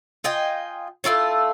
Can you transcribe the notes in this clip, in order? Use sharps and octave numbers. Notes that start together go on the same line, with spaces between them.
F4 D#5 G5 G#5
A3 E4 F4 C#5